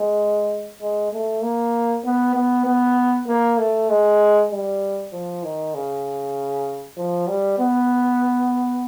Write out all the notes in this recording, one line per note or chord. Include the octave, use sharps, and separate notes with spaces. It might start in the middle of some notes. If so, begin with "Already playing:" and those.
Already playing: G#3
G#3
A3
A#3
B3
B3
B3
A#3
A3
G#3
G3
F3
D#3
C#3
F3
G3
B3